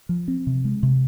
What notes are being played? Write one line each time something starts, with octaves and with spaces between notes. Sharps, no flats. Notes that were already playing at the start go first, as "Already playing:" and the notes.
F3
C4
C3
G#3
C3